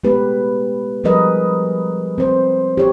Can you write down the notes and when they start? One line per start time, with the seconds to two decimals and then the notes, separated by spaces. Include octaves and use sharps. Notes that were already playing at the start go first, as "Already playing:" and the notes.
0.04 G#3 A3 B3 G4 B4
1.04 F3 G3 G#4 A#4 B4 D#5
2.18 C4 C5
2.77 G4 C#5